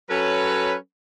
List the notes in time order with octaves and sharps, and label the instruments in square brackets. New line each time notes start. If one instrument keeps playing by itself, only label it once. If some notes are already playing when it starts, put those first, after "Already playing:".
[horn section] F#3 C#4 A4 B4